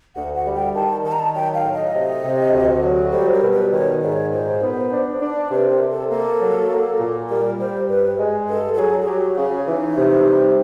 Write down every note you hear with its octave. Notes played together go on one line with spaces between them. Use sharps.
D2 F#5
F#5
G3
G5
D#3 A5
D#3 A5
A#5
A5
F#3 G5
F5
A2
D#5
C3
C3
D2
F#3
G3 C5
A#4
B2
B4
D#3 C#5
G#2 D5
C#5
A#2 C5
B3
D4
D4
C3 B4
A#4
C3
A4
A#3 A4
F#3
A#3
A#2
G3 A#4
G3 C5
G2 B4
G#3
G2 A4
A4
F#3 G#4
G#4
F#3 G4
C#3
E3 D#4
C3
G3